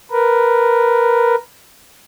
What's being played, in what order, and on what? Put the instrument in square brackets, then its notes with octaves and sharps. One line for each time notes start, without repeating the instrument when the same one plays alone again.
[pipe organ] A#4 B4